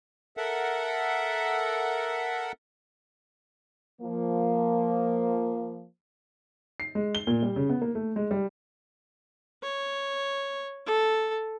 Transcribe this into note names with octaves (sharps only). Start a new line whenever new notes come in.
A4 A#4 E5 F#5
F3 A#3
C7
G#3
G7
A#2
G3
C#3
B3
A#3
A3
G#3
G3
C#5
A4